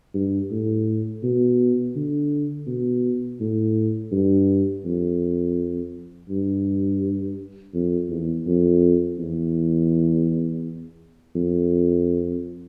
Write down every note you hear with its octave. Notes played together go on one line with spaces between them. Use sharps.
G2
A2
B2
D3
B2
A2
G2
F2
G2
F2
E2
F2
E2
F2